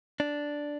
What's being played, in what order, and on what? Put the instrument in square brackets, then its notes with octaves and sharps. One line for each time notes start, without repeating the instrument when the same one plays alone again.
[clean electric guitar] D4